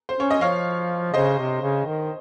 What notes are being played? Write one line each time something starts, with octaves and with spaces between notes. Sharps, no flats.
C5
C#4 C#5
D#5
F3 C#5 F5
C#3 C5 D#5
C3
C#3
D#3